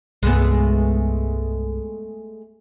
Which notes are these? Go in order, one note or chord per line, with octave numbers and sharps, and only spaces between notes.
C2 G2 G#3 A3 B3